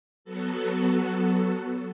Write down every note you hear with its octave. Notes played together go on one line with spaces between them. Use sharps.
F#3 B3 F#4 A4